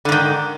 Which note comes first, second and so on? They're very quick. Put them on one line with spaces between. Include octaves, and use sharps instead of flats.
D3 G#2 D#3